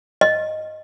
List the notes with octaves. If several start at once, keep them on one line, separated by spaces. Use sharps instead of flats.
D#5